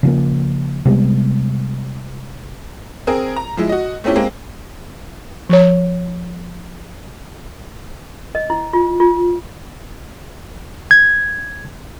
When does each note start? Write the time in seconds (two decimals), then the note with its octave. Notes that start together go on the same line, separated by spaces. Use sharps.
0.03 C#3 F3 A#3
0.85 C3 G3 G#3 B3
3.07 C4 G#4 A#4
3.36 A#5
3.57 F3 G#3 E4
3.69 F#4 D#5
4.04 A3 C4 C#4 E4 G4
4.16 G#3 A#3 C4
5.49 F3 C#5
8.35 D#5
8.50 E4
8.73 F4
9.00 F4
10.91 G#6